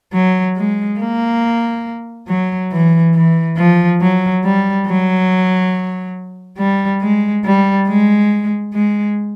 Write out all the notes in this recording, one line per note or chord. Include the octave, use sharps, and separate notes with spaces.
F#3
G#3
A#3
F#3
E3
E3
F3
F#3
G3
F#3
G3
G#3
G3
G#3
G#3